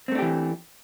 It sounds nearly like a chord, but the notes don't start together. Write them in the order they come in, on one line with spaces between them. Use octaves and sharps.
C4 A3 D4 G4 E3